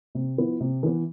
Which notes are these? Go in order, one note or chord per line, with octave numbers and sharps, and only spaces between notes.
C3
F3 B3 E4
C3
E3 B3